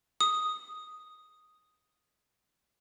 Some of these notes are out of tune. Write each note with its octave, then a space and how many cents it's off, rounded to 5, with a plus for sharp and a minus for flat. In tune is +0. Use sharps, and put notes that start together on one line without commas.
D#6 +0